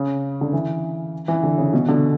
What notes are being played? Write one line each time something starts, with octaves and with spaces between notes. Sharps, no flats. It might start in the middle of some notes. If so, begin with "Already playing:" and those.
Already playing: C#3
D3
E3
E3
D3
C#3
B2
D3